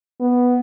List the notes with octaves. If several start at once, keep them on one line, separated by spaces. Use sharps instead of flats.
B3